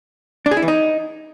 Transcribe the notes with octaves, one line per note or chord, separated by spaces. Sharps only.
D4
G#4
E4
E3
D#4